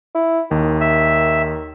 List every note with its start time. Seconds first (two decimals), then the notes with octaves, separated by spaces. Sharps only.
0.15 E4
0.51 D#2 D#3
0.81 E5